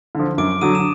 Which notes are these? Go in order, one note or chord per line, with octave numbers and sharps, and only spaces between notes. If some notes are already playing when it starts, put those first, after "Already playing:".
D3 F3
F#2 D6 D7
D3 F#3 D#6 D#7
E7